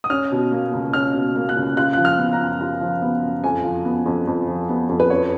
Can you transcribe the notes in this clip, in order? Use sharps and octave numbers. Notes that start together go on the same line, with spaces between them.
D#6
C#4 F6
B2
A#3
C#2
C#4 F6
B2
A#3
F#6
C#2
F4 F#6
F#6
F3
F6
B3
A#5
F#2
F4
F3
B3
F#2
F2 G#5
F3
B3
F2
F2
F3
B3
F2
B4
F#2 C#5